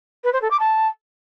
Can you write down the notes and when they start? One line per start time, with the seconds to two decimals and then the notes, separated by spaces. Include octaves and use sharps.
0.24 B4
0.32 C5
0.41 A4
0.50 D6
0.59 A5